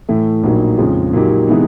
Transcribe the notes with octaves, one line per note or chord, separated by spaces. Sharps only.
A2 E3 A3
A#1 A#2 F#3 A#3 D#4
F2 C#3 F3 G#3
A#2 F#3 A#3 D#4 G4
C3 E3 G#3 B3 D#4